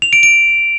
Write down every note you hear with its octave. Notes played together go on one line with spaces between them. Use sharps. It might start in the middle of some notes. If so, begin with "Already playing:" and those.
F7
D7
D7